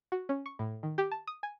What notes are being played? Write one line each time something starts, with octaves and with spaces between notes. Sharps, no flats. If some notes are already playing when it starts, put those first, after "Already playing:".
F#4
C#4
C#6
A2
D#3
G4
A5
D#6
G#5